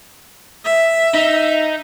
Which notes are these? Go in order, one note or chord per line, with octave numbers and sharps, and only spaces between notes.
E5
D#4